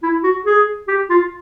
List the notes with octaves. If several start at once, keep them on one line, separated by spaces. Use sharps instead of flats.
E4
F#4
G#4
G4
F4